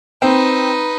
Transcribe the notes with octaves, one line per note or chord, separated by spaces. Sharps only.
C4 D#4 B4